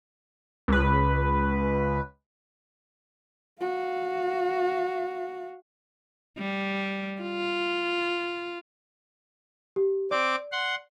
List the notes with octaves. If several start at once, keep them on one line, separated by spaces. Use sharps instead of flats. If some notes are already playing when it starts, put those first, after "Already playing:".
C#2 B4
F#4 F5
G3
F4
G4
C4 D5 D6
F#5 C6